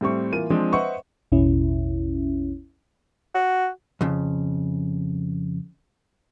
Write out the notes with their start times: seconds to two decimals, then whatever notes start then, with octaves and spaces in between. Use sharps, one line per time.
0.01 A2 G3 C4 C#6
0.33 E3 A#3 F4 D#7
0.50 F3 G#3 C4 D4
0.72 B4 C5 D#5 E5 F#5 C#6
1.32 A1 E2 B2 C#4 E4
3.35 F#4
4.01 F2 C#3